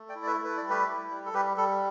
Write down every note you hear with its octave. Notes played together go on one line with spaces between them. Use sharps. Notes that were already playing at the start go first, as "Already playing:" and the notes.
Already playing: A3
D5 G5
E4
D5
B4 E5
A3
B4
D5
G3
G4 B4
E4
G3
A4
G3 G4 B4
G3 A4